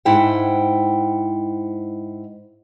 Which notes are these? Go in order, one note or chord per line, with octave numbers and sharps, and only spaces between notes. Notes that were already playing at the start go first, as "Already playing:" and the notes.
G#2 E4 F#5 G5